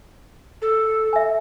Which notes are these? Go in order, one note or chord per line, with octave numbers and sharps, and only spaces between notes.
A4
E5 G#5